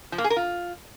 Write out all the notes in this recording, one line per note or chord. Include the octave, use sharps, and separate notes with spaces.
F3
A#3
G#4
A#4
F4